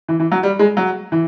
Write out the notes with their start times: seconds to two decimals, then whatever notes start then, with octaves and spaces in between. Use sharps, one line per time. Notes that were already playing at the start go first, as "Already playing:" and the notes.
0.08 E3
0.20 E3
0.31 F#3
0.43 G3
0.59 G#3
0.77 F#3
1.12 E3